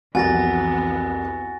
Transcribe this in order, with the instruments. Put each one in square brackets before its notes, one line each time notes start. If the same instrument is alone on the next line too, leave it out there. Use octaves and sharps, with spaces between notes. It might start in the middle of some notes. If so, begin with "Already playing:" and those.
[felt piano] C2 F2 [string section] E3 B3 [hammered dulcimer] F#4 [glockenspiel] G#5 A6 A#6